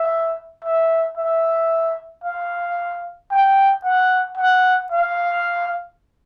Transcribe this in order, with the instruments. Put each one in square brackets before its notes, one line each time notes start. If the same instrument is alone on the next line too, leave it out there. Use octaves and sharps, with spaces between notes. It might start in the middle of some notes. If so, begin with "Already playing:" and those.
Already playing: [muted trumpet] E5
E5
E5
F5
G5
F#5
F#5
F5